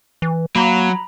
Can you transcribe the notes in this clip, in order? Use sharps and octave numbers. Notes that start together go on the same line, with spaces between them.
E3
F#3 A#3 A#5 B5